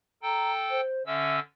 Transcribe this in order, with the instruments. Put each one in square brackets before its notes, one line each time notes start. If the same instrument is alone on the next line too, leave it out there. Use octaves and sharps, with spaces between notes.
[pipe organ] A4 G5 [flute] A#5
[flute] C5
[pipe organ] D3 C#4 E6 [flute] E5